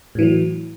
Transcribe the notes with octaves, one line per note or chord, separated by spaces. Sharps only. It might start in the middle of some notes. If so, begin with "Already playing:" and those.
A2 E3 F#3